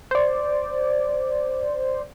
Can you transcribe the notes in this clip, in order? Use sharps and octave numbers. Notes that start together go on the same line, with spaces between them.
C5 D5